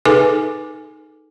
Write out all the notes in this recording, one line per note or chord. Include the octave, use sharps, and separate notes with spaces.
D#4 G#4 A4 B4 G#5 D6